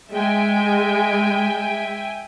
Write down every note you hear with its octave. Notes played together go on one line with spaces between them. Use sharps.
G#3 E5 G5 G#5